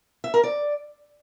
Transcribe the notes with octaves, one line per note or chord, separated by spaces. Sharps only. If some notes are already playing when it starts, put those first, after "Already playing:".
E5
A#4
D5